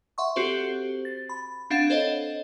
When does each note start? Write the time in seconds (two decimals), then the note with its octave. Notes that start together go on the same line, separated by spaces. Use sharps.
0.18 E5 F#5 C6 C#6
0.36 C4 F#4 G4 A4 C5
1.05 A6
1.29 B5
1.70 C4 D4 F5 F#5 A6 E7
1.90 A4 C5 C#5 D#5